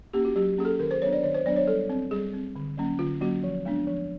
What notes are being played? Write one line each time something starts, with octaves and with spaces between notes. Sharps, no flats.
A#3 C#4 G4
F#4
F#3 G4
A#3 C#4 G#4
A4
D#3 A#4
C5
F#3 B3 D4 C#5
D5
D#3 C#5
C5
F#3 B3 D4 D5
C#5
G3 A4
C4
G3 G#4
C4
D3
F#3 A#3 C#4
D3 F4
F#3 A#3 C#4 F#4
F3
G#3 B3 D4
F3